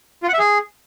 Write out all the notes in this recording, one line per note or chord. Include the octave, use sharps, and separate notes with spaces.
F4
F#5
E5
G#4